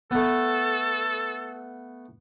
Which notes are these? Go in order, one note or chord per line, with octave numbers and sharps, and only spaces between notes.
A3 B3 A4